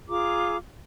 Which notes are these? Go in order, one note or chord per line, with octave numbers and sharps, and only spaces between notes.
F4 G#4 A#5 D6